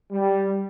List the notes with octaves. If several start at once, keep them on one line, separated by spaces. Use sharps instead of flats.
G3